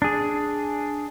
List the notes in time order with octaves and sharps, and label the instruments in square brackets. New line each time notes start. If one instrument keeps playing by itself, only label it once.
[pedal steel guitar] D4 G#4